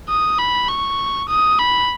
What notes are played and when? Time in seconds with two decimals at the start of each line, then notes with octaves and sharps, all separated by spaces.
0.09 D#6
0.39 B5
0.69 C#6
1.29 D#6
1.59 B5